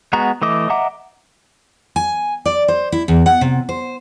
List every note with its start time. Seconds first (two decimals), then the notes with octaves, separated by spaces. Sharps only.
0.13 G#3 B3 F#4 A#5
0.42 E3 A3 D#5 D6
0.69 D#5 E5 F#5 A#5 D6
1.96 G#5
2.46 D5
2.68 C5
2.92 E4
3.08 E2
3.26 F#5
3.41 C3
3.69 C5